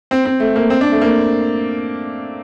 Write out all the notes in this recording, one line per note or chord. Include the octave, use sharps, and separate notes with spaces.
C4
C4
A3
A#3
C4
D4
A3
A#3